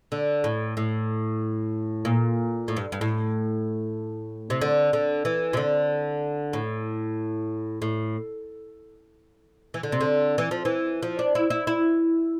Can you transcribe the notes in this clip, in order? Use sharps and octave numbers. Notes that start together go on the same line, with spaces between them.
D3
A2
A2
A#2
A2
G2
G2
A2
C3
D3
D3
E3
C3
D3
A2
A2
E3
D3
C3
D3
E3
F3
E3
F3
D4
E4
E4
E4